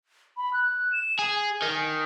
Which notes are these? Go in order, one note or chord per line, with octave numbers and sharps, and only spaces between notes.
B5
F#6
E7
G#4 G#5
D#3